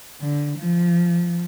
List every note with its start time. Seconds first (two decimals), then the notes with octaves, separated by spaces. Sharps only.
0.21 D3
0.58 F3